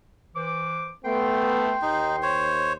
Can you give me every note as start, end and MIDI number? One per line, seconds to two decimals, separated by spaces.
0.36 0.90 52
0.36 0.90 72
0.36 0.90 86
1.05 1.74 57
1.05 1.74 59
1.05 2.58 79
1.05 2.58 84
1.82 2.77 39
1.82 2.16 63
2.23 2.73 72
2.23 2.73 73